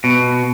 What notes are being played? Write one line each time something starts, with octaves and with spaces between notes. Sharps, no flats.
B2